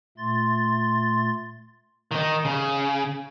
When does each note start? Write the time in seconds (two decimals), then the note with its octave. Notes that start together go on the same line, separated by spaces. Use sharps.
0.18 A#2 A3 C6 A6
2.11 D#3 D#4
2.45 C#3